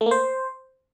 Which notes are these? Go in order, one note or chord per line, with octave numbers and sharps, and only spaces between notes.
A3
A#3
C5